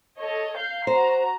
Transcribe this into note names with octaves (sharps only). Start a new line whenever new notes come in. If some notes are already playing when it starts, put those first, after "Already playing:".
A4 C#5 D#5
F5 G6 C7
F#4 C5 A#5